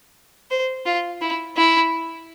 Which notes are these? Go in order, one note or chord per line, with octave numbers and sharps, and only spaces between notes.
C5
F4
E4
E4